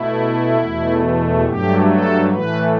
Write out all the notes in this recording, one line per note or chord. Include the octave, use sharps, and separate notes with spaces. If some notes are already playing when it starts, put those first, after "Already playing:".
Already playing: B2 A3 E4
E2 B2 A3
G2 F#3 A3 G4
A4
A2 E3 A3 B4